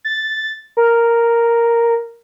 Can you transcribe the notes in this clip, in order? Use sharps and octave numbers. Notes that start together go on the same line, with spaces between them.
A6
A#4